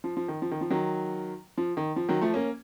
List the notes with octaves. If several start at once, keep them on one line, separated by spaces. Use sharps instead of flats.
F3
F3
D#3
F3
D#3
F3
D#3 F#3
F3
D#3
F3
D#3 F#3
F3 A3
A#3 C#4